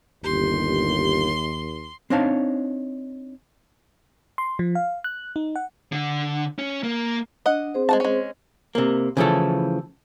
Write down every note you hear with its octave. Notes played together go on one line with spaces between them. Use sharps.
G1 D#2 G4 C6
C4 D4 D#4 C#5 F5 A5
C6
F3
F5
F#6
D#4
F#5
D3
C#4
A#3
D4 D#5 F#5
C4 G#4 C5
G#3 F#4 A5
G#3 C#4
C3 A#3
C#3 E3 F3 A3 E4 A4